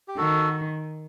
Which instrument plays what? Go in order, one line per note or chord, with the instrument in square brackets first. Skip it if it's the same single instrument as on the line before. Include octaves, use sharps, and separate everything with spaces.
[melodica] G4
[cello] D#3 [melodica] F#4 A4